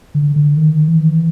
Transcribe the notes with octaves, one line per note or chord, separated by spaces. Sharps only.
D3
D3
D#3
E3